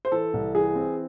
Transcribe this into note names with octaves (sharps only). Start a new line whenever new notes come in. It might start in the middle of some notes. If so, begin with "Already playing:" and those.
C5
E3 A4
C2
E3 G#4
C4